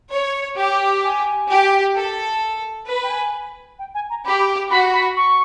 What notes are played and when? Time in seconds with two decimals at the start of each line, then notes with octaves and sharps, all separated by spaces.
0.12 C#5
0.57 G4
1.04 G#5
1.49 G4
1.95 A4
2.87 B4
3.03 G5
3.10 G#5
3.79 G5
3.94 G#5
4.10 A#5
4.25 G4 B5
4.70 F#4 B5
4.93 B5
5.17 C#6